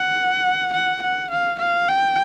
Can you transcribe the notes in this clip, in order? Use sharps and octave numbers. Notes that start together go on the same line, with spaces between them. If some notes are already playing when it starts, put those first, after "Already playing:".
Already playing: F#5
F#5
F#5
F5
F5
G5